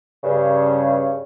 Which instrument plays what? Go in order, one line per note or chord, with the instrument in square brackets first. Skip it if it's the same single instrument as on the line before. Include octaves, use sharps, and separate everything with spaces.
[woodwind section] G2 C#3